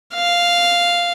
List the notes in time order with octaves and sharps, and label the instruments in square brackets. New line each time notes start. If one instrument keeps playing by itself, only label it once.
[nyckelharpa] F5